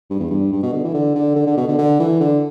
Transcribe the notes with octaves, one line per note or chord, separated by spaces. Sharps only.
G2
E2
G2
G2
B2
D3
E3
D3
D3
D3
D3
B2
D3
D3
E3
D3